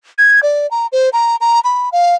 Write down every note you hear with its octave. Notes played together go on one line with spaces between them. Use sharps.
G#6
D5
A#5
C5
A#5
A#5
B5
F5